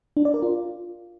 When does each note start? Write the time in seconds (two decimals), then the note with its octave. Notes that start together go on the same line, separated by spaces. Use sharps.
0.17 D4
0.25 D5
0.34 A#4
0.42 F4